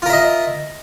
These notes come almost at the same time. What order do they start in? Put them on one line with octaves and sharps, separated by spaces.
F4 A#4 E5 D#5